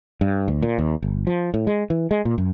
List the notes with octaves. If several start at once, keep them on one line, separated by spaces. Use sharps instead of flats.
G2
D2
A#2
D#2
G1
F3
A2
G#3
E3
G#3
A#2
F#2